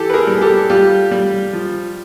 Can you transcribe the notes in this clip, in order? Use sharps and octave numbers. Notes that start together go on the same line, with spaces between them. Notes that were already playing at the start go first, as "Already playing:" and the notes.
Already playing: E3 G4 A4
B4
G#4 A#4
G3
G#4
G4 A4
G3 F4 G4
G3
F3